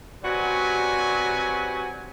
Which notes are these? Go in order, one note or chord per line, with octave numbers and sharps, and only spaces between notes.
C3 F#3 G3 F#4 B4 G#5